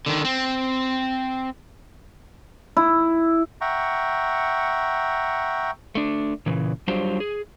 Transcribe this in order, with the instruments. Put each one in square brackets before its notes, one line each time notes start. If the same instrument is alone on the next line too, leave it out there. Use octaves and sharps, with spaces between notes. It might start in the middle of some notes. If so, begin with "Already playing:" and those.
[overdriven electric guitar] D3 D#3
C4
[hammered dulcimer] E4
[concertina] E5 F#5 G5 A#5 C#6
[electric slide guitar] A3 D4
A#2 C#3 E3
F#3 G3 D4 F4 G4 C5
G#4